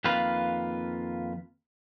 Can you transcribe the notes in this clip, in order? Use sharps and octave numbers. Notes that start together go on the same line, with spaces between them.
F2 D#3 A#3 F4 B4 F5